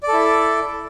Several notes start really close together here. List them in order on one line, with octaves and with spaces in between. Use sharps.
D5 A4 E4